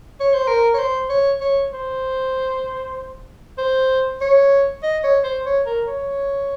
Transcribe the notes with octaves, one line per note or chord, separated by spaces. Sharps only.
C#5
C5
A#4
C#5
C5
C#5
C#5
C5
C5
C#5
D#5
C#5
C5
C#5
A#4
C#5